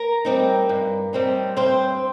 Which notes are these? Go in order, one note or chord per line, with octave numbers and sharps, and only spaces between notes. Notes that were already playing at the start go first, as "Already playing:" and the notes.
Already playing: A#4 A#5
G3 C4 D#4
G2
G3 C4 D#4
G2 C4 C5